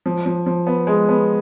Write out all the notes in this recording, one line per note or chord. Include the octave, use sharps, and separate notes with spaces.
F3
F3
F3
B3
G#3
B3